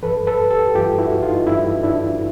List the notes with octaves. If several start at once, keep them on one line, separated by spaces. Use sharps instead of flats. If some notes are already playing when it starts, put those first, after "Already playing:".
G2 E3 A4 B4
A4 B4
G4 A4
G2 E3 F4 G4
E4 F#4
D#4 F4
G2 E3 D4 E4
D4 E4